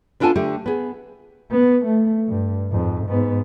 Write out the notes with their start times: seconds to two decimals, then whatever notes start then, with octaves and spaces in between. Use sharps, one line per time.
0.20 B3 D4 F4 A4 G#5 A5
0.36 D3 A3 G4
0.66 B3 G#4
1.51 B3
1.86 A3
2.28 G2
2.71 F2 G#2
3.06 G#2 B3